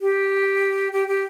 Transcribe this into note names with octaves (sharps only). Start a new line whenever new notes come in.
G4
G4
G4